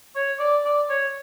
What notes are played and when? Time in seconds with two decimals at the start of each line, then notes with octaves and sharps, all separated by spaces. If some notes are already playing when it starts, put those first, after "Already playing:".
0.16 C#5
0.39 D5
0.64 D5
0.89 C#5